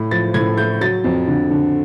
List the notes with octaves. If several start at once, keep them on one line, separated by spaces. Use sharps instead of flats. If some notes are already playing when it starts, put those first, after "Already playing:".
Already playing: A2
F3 A6
A2 G#6
A3 G6
F#3 A6
F2
D3
D3